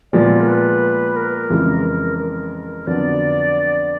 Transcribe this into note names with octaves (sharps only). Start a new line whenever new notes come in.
A#2 F3 G#3 B3 D5
A#4
B4
A#4
F2 C#3 E3 G#3
A#4
F2 D3 F#3 B3 D4 D5